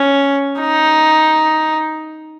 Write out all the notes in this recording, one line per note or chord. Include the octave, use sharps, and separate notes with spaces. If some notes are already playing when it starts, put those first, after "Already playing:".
Already playing: C#4
D#4